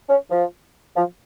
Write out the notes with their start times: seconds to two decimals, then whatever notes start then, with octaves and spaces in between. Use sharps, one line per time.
0.09 C#4
0.31 F3
0.96 F3